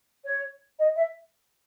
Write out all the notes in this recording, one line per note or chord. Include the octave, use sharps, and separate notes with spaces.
C#5
D#5
E5